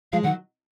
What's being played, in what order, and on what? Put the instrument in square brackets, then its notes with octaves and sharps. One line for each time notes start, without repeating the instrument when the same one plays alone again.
[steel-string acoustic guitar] F3 G#3 [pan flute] F5
[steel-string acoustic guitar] D#3 F#3 [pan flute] F#5